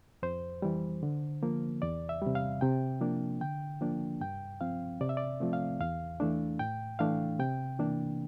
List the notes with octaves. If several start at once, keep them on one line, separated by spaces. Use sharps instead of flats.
F2 C5
E3 G3
D3
F3 A#3
E2 D5
E5
C3 G3
F5
C3 G5
F3 A#3 D4
D3 G5
F3 A#3 D4
G2 G5
F3 C4 F5
C3 D5
E5
D5
F3 A3 C4
F5
E2 F5
E3 A3 D4
A2 G5
E3 A3 D4 F5
C3 G5
E3 A#3 D4